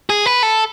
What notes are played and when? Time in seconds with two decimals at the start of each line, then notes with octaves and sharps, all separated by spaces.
0.10 G#4
0.26 B4
0.43 A4